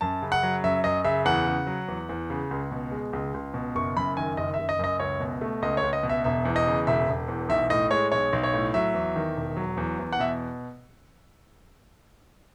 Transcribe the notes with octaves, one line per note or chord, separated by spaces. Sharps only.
F#2 A5
C#3
F#5
F#3
F#2 E5
F#2 D#5
C#3 E5
E2 F#5
C#3
F#3
E2
E2
C#3
C#2
B2
G#3
C#2
C#2
B2
F#1 C#6
F#2 B5
D#3 G#5
F#1 D#5
F#1 E5
D#5
F#2 D#5
C#2 C#5
B2
A3
C#2 D#5
C#5
C#2
D#5
B2
E5
E1 E5
E2
D#5
C#3
E1 E5
E1
E2
B1 E5
A2 D#5
G#3 C#5
B1 C#5
B1
C#5
A2
F#3 E5
E2
D#3
E1
F#3
E2
E2
F#5
B2 E5